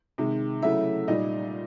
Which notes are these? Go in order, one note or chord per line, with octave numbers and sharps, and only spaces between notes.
C3 D#3 G#3
C#3 F#3 A3 E4 E5
A#2 G3 D#4 D#5